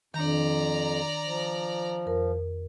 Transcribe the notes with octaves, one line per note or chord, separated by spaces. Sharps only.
F2 D#3 D4 D5 A#5
F3
F2 A#4